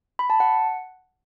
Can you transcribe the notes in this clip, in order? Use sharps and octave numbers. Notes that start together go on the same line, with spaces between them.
B5
A5
F#5